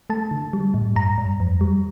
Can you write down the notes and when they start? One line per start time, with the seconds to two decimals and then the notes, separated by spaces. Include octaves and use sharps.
0.10 A3 A5
0.31 D3
0.53 G3
0.74 A2
0.96 G2 A#5
1.18 G2
1.40 F2
1.61 G3